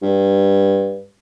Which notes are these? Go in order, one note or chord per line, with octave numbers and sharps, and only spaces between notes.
G2